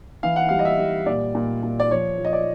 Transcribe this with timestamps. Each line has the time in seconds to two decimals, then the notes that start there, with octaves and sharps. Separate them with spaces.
0.23 E3 F5
0.36 F#5
0.49 G3 F5
0.59 D#5
0.65 E5
0.79 G3
1.06 A#2 D5
1.35 A#2
1.63 A#2
1.80 D5
1.91 F3 C#5
2.18 F3
2.25 D#5
2.33 D5